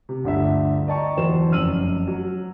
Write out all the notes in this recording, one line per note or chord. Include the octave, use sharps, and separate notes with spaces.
C3
G1 D2 E5
D5 D#5 G5 A5 A#5 C#6
E2 F#3 C5 E7
F1 F#2 E6 F6 D#7 F#7
F#3